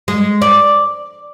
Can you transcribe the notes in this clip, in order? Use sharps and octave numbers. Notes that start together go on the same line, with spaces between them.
G#3
D5